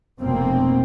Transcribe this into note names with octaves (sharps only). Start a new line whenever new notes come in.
F1 B2 A#3 C4